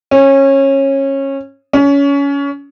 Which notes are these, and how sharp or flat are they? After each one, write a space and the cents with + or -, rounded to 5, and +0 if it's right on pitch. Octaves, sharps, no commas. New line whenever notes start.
C#4 -20
C#4 +25